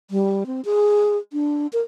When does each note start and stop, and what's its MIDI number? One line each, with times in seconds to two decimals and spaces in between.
0.11 0.44 55
0.46 0.61 60
0.65 1.17 68
1.33 1.67 62
1.73 1.81 70